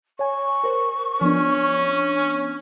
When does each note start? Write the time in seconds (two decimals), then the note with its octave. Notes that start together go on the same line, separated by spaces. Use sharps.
0.19 C#5 G#5 C#6
0.64 A#4 C5
1.21 F3 B3 C#4 D4